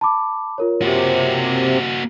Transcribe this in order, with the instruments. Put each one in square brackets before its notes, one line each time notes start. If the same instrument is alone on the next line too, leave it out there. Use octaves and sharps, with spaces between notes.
[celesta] A5 B5 D6
F4 A#4 C#5
[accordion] C3 [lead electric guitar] A#3 F#4